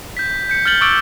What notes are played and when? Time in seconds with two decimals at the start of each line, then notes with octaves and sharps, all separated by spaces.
0.17 G6 B6
0.49 G6 C#7
0.65 F6 G6 A6 F#7 G7
0.81 C#6 D6 E6 A6 D7